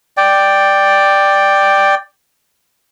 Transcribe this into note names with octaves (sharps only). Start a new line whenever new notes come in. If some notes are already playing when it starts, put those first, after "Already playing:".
D5 G5